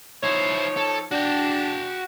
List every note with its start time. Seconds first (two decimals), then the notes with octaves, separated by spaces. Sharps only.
0.23 F3 D#4 E4 C5 C#5
0.77 A4
1.11 D4 F#4 G5